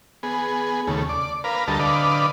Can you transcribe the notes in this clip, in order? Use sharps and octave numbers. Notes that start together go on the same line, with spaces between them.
B3 G#4
D#2 C#3 A3
D5
A#4 B4 F5
D2 G3 A4 A#4 D#5 A5
D3 B4 D5 D#5 F5